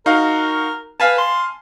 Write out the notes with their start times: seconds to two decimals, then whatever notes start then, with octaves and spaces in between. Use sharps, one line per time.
0.06 D#4 F#4 A#4 F5
1.00 B4 F5 G#5 A5
1.18 C6